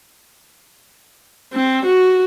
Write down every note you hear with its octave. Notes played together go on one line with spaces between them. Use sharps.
C4
F#4